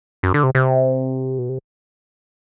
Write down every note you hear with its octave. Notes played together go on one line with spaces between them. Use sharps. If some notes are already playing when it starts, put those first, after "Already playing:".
F#2
D3
C3
C3
B2
C3